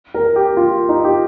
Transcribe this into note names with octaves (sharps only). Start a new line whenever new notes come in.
A#4
G4
F4
D#4
G4